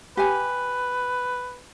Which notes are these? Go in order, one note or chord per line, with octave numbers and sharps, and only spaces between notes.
G4 B4 G#5